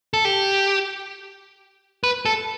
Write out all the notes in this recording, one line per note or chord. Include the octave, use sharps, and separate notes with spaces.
A4
G4
B4
A4